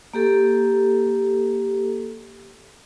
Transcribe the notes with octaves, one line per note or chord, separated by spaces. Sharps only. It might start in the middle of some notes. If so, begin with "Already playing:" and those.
A#3 G4 A4